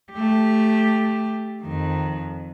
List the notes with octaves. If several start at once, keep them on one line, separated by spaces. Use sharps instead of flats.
A3 G4
F2 D#3